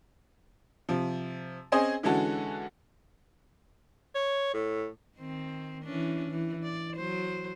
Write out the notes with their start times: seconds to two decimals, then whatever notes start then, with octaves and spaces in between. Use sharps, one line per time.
0.89 C3 F3
1.72 C4 C#4 G#4 C5 D#5
2.03 D3 E3 G#3 C#4 F#4 A4
4.15 C#5
4.53 A2
5.17 D#3 C4
5.84 E3 C#4 D4
6.30 E3
6.63 D5
6.96 F#3 C5